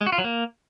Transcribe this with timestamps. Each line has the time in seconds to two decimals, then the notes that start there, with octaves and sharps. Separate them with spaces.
0.01 G#3
0.07 F#4
0.12 F4
0.18 F#3
0.24 A#3